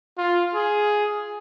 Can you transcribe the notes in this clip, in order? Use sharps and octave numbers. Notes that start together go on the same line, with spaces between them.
F4
G#4